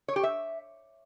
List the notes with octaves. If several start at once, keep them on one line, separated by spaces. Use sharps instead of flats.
C#5
G4
E5